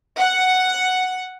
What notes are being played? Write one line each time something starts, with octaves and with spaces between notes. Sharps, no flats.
F#5